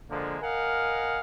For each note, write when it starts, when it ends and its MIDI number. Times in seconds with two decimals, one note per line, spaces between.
0.10 0.38 50
0.10 0.38 53
0.10 0.38 56
0.10 0.38 58
0.42 1.21 70
0.42 1.21 75
0.42 1.21 77
0.42 1.21 78
0.42 1.21 80